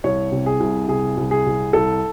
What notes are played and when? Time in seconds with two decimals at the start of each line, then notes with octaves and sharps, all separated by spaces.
0.04 C2 C#5
0.32 C3
0.46 G#4
0.60 C2
0.88 C3 G#4
1.17 C2
1.31 G#4
1.46 C2
1.73 C2 A4